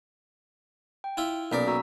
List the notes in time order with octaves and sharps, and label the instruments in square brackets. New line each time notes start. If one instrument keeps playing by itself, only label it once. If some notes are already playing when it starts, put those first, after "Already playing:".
[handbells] G5
[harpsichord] E4 F4 E5
[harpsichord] B1 A#4 D5 [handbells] A#3 C#4 B6
[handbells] F#4 A#5 E6